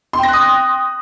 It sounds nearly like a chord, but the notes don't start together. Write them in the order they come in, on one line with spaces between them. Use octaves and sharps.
C6 G5 A#6 F#6 D#6